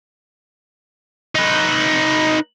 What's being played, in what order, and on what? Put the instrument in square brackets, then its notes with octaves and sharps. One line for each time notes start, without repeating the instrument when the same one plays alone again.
[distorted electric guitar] D#4 B4